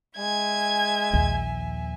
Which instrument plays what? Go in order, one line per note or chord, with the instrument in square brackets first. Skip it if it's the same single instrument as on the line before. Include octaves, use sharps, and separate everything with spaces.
[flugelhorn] G#3 [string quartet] E5 G#5 [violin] G#6
[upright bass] A#1 D#2